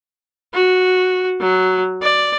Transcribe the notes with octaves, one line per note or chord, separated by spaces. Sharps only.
F#4
F#3
D5